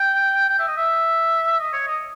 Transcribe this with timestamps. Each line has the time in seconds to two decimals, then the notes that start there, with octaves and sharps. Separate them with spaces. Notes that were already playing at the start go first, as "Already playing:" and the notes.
Already playing: G5
0.50 G5
0.59 E5
0.67 D#5
0.77 E5
1.59 D#5
1.73 C#5
1.87 D#5